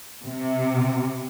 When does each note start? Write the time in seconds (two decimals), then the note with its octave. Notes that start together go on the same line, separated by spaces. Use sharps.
0.23 C3